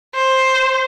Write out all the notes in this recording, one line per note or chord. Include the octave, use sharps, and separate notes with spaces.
C5